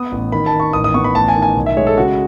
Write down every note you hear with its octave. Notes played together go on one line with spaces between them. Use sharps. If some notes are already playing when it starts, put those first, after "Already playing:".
Already playing: B3 D#6
A1
D#3 B5
A5
D#3
C#6
A1 D#6
D#6
B3 C#6
B5
A1 A5
G#5
D#3
G#5
B1
E5
G#3 C#5
A4
C#3 F#4